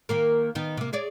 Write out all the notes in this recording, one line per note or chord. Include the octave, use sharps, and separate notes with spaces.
D#3 A#3 A#4
D#3 B3 D#4
C3 A#3
G#4 C#5 D5